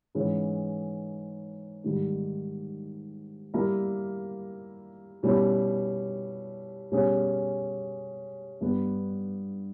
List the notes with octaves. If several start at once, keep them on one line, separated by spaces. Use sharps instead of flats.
G#2 E3 G#3 C#4
G#2 D#3 G3
G3 A#3 E4 A#4
B2 G3 C#4 E4
B2 G3 C#4 G#4
G2 G3 B3 G4